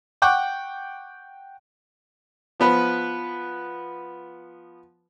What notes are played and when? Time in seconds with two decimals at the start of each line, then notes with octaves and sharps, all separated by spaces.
0.22 F#5 G5 C#6 D6
2.60 F3 B3 B4